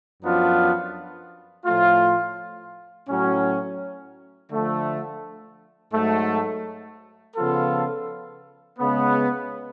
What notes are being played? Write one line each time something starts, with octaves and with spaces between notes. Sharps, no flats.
F#2 F3 B3 D4 F4
A2 F3 A3 F4
A2 F#3 C#4
D3 F3 A3
G#2 F#3 A3
C#3 F3 B3 F4 A4
C#3 G#3 B3